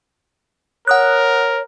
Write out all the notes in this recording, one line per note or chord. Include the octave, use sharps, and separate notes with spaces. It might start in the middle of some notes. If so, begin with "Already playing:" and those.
A#4 C#5 F#5 D#6 F#6